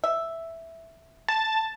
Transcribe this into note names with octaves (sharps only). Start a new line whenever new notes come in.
E5
A5